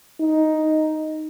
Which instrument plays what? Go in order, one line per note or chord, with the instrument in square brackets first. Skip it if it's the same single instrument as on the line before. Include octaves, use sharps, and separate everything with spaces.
[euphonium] D#4